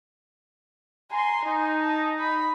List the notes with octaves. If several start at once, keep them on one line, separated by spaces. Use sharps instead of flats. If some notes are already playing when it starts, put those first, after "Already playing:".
G#5 A#5 C6
D#4 G#5
A5
B5